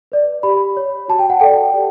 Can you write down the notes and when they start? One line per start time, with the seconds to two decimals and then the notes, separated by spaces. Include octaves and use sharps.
0.12 B4 D5
0.43 G4 B5
0.77 C#5
1.08 F#4 A5
1.19 G5
1.30 F#5
1.40 A4 D5 G5
1.74 G4